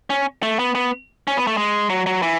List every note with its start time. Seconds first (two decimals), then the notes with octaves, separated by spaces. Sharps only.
0.10 C#4
0.43 A3
0.59 B3
0.75 B3
1.28 C#4
1.37 B3
1.47 A3
1.57 G#3
1.90 F#3
2.06 F#3
2.22 E3